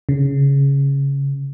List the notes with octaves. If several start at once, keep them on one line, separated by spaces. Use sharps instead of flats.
C#3